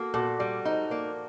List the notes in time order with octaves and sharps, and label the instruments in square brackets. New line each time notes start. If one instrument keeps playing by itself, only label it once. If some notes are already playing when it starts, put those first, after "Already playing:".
Already playing: [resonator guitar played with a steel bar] A#3 [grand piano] F#4 A4
[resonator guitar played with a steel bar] A#2 [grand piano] F#4 A4
[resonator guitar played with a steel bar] G3 [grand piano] D5 F#5
[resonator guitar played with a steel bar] D#4 [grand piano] C5 D#5
[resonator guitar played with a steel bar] A#3 [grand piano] A#4 D5